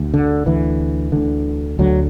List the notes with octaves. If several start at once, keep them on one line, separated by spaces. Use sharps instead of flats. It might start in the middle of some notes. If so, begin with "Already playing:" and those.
Already playing: D2
D3
D2 D3 E3
D2 D3
D2 D3 F#3